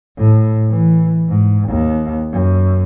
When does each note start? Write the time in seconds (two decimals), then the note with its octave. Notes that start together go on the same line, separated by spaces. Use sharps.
0.17 A2
0.70 E3
1.29 G#2
1.69 D#2
2.32 F#2